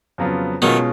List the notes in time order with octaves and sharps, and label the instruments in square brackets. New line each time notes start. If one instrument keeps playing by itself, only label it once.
[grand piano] F2 C#3 F#3 B3 F4
[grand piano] B2 G#3 C#4 F4 [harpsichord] D#3 F#3